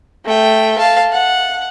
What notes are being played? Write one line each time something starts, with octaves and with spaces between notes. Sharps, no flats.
A3 G5
F5 A5
F#5